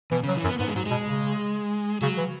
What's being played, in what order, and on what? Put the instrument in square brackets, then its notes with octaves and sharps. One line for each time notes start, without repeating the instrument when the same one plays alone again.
[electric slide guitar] B2 [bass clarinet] E3
[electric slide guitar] C#3 [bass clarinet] F#3
[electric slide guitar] E3
[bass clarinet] F#2
[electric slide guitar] B3
[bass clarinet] G#2 [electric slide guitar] B3
[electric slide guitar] G#3
[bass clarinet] G#2 [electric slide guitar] F#3
[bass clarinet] B2 [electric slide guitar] G#3
[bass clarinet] C#3
[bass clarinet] C#3 [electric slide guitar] F#3
[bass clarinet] E3